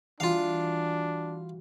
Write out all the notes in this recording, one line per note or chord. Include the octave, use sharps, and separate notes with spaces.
E3 G3 D4 F4 F#4 F5